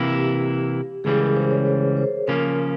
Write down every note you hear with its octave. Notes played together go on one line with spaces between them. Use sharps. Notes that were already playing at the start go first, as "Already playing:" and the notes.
Already playing: C3 E3 A#3 E4
G4
C#2 C#3 E3 G3 G#4
A#4
C5
C5
C#5
C#5
C5
C#3 F3 A#3 C#4 A#4